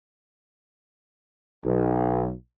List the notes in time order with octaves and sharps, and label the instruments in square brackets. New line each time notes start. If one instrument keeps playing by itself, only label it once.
[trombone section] B1